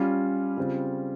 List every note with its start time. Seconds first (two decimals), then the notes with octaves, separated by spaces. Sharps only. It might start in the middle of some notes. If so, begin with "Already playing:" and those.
Already playing: G3 C#4 F4
0.57 C#3 G3 C4 F4